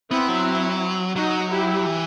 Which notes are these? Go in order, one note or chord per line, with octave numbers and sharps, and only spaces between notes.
B3 C4 E4
F#3
F#3 D#4 F#4
E4 G4
E3